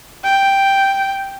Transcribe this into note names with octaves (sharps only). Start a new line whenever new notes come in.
G5